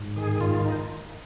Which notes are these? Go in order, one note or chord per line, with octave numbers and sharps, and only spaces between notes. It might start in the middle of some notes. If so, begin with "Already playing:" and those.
Already playing: G#2
D#3 G#4
G#2 F4
D#4